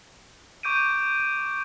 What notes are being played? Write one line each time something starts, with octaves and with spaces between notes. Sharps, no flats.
C#6 D6 G6 D7 D#7